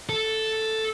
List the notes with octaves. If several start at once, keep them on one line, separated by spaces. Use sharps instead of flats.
A4